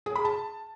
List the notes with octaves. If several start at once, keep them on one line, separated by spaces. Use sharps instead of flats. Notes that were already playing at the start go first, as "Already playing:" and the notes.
G#4
B5
A5